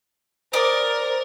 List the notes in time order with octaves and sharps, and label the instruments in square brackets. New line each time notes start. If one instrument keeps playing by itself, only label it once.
[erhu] A#4 [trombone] C5 [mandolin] D5 D#5